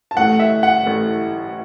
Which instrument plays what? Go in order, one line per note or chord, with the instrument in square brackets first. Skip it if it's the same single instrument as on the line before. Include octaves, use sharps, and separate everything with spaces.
[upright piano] A5
A1 A2 A3 F#5
E5
F#5
A1 A2 A3